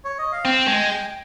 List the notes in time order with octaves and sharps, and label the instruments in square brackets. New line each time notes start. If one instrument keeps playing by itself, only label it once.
[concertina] C#5
D#5
F5
[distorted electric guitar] C4 [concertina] G5
[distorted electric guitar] G#3